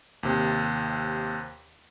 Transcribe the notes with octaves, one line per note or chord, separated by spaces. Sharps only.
D#2 C3